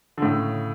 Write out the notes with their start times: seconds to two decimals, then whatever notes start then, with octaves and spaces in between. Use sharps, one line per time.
0.18 D3
0.22 A2 C#3